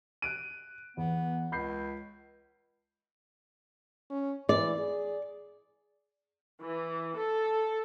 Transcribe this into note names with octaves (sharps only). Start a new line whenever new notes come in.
F#6 D7 D#7
E2 B3
C#2 B5 G6 C7
C#4
E3 D5
G#4
E3
A4